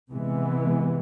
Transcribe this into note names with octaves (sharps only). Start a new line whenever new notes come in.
C3 E3 G#3 B3